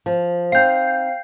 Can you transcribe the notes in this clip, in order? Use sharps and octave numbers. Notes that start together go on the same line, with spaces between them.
F3
C4 D#4 F5 G5 G6 C7